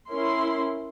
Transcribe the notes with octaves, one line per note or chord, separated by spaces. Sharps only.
C#4 E4 A#4 C6